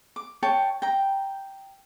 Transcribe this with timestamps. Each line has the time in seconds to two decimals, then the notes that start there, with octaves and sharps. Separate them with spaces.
0.16 D6
0.43 C#5 G5 A5
0.82 G5 A#5